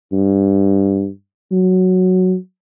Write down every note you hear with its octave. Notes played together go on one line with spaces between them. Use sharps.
G2
F#3